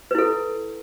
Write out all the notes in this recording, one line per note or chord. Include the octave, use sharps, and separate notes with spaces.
E4 A4 B4